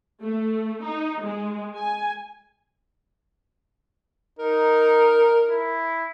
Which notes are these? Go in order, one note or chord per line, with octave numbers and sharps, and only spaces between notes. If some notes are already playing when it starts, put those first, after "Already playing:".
A3
D#4
G#3
G#5
D#4 A#4
E4